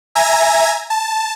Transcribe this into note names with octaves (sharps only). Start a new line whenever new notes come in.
E5 G#5 A#5 G#6 A#6
A5